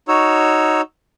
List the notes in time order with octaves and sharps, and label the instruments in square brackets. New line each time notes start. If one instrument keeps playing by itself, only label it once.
[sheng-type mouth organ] D#4 F#4 C#5 E6